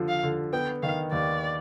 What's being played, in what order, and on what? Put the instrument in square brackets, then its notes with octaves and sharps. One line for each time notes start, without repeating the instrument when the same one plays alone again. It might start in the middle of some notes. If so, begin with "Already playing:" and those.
Already playing: [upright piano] D3 F3
[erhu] F5
[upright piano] D3
[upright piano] B3 [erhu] G5
[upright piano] D#3 [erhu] F5
[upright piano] D#2 [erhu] D5